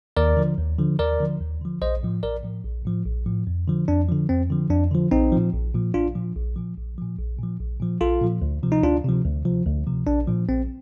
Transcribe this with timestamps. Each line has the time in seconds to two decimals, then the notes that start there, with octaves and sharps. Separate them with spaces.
0.17 D#2 A#4 D5
0.37 D3 F3
0.58 D#2
0.79 D3 F3
0.99 D#2 A#4 D5
1.20 D3 F3
1.41 D#2
1.61 D3 F3
1.82 A#1 C5 D#5
2.03 A2 F3
2.23 A#1 A#4 D5
2.43 A2 F3
2.64 A#1
2.85 A2 F3
3.06 A#1
3.26 A2 F3
3.47 F2
3.68 D3 F3
3.88 F2 D4
4.09 D3 F3
4.29 F2 C4
4.50 D3 F3
4.70 F2 D4
4.91 D3 F3
5.11 A#1 C4 D#4
5.32 A#2 F3
5.53 A#1
5.74 A#2 F3
5.94 A#1 D4 F4
6.15 A#2 F3
6.36 A#1
6.56 A#2 F3
6.77 A#1
6.98 A#2 F3
7.18 A#1
7.39 A#2 F3
7.59 A#1
7.80 A#2 F3
8.00 A#1 F4 A4
8.21 A#2 F3
8.42 D2
8.63 C3 F3
8.72 D#4
8.83 D2 D4 F4
9.04 C3 F3
9.25 D2
9.45 C3 F3
9.66 D2
9.87 C3 F3
10.07 A#1 D4
10.27 A#2 F3
10.49 A#1 C4